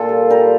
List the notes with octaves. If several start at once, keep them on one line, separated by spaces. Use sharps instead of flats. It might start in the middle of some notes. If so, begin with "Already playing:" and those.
Already playing: A#2 F4 A4
G3
G3 G4 A#4